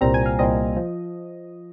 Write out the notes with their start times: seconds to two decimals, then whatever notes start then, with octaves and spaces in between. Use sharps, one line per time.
0.01 C2 A#2 G3 C4 A#5
0.14 G#5
0.26 F5
0.39 C2 A#2 G3 C4 D#5
0.77 F3